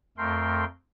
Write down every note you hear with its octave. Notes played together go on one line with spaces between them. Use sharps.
F2 A3 A#4 G5 C6